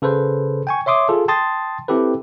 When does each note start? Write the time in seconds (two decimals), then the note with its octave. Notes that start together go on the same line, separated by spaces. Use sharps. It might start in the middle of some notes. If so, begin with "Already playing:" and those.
0.02 C#3 A4 B4 C5
0.67 G5 G#5 C#6
0.86 C#5 E5 C6 D6 D#6
1.09 F4 G#4 A4
1.28 G5 A5 C6 D#6 A6
1.88 C4 E4 G4 A4 B4